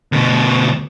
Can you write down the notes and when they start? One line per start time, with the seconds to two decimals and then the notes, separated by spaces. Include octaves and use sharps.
0.12 D2 B2